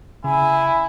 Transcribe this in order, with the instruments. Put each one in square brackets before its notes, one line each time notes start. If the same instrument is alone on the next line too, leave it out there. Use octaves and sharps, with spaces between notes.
[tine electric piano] C#3 [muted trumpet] E4 [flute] G#5